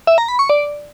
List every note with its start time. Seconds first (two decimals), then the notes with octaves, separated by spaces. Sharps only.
0.07 E5
0.18 A#5
0.28 B5
0.39 C#6
0.50 D5